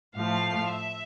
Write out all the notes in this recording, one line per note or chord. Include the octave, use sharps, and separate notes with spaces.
A2 F3 A3 F5
E5